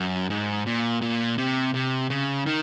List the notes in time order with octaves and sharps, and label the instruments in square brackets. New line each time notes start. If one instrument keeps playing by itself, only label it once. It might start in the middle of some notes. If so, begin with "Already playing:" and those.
Already playing: [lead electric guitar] F#2
G#2
A#2
A#2
C3
C3
C#3
D#3